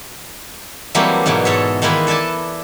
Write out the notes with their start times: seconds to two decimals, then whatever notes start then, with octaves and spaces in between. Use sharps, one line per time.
0.95 E3 F#3 G3 A3 A#3 C4
1.26 G#2 B2 E3 F#3
1.45 G#2 A4 C#5 E5
1.82 D#3 E3 G#3 A#3 E4 B4
2.07 A4 D5 E5 G#5 A5